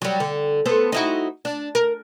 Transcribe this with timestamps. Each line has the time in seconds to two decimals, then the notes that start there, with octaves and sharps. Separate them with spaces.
0.02 F#3 G3
0.20 D3
0.66 B3 A4 C5
0.92 D#4 E4 F#4
1.45 D4
1.75 A#4